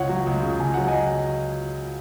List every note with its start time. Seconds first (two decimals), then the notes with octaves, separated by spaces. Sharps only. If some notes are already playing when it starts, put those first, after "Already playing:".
Already playing: C#2 C#5 F#5
0.09 F#3
0.27 C#2
0.43 C#3
0.59 C#2 G#5
0.74 F#3 F#5
0.88 D#5 G#5